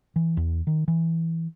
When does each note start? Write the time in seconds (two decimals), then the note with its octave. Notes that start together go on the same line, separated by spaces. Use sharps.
0.16 E3
0.37 E2
0.67 D#3
0.88 E3